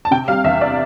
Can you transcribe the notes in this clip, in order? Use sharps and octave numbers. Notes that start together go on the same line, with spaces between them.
A5
C3 G5
G3 F5
E2 E5
D5